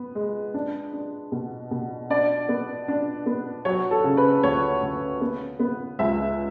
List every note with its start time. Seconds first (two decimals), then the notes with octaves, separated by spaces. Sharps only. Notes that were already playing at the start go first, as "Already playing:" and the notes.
Already playing: B3
0.15 G#3
0.54 D4
0.93 D4
1.32 B2
1.71 B2
2.10 D4 D5
2.49 B3
2.88 D4
3.26 B3
3.65 F#3 C#5
3.91 A4
4.04 C#3
4.17 B4
4.43 D2 C#5
4.82 D2
5.21 B3
5.60 B3
5.99 C#2 E5